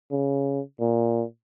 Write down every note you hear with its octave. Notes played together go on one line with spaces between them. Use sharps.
C#3
A#2